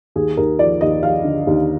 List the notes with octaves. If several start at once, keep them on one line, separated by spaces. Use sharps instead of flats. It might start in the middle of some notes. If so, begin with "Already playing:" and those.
D#2 G#4
D#2 A#4
F3 D5
D#2 D#5
F3 F5
D3
D#2